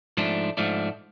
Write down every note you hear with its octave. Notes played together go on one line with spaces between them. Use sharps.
G#2 F3 A3 D4
G#2 F3 A3 D4